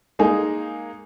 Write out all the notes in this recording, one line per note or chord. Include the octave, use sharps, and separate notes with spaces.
G#3 A#3 D#4 G#4